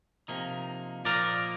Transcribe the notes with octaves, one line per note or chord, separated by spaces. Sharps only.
C3 F3 A#3 D#4
A#2 F3 A#3 D#4 A#4 D5